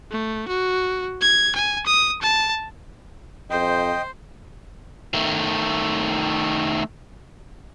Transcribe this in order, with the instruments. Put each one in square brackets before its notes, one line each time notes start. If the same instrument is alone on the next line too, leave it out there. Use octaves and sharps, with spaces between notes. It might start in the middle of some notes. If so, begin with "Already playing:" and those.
[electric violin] A3
F#4
G#6
G#5
D#6
A5
[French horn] F2 [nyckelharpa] C5 [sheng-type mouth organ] D#5 G5
[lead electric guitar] D#3 A3